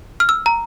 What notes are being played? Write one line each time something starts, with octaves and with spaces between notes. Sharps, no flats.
F6
E6
A#5